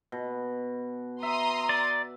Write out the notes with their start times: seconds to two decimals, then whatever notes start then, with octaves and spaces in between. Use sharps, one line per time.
0.12 B2
1.23 E5 A#5 C6 D#6
1.69 D5